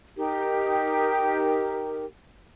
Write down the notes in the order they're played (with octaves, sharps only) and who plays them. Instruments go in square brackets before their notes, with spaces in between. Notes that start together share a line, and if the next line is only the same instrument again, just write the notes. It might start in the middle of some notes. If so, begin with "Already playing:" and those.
[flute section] D#4 G4 A#4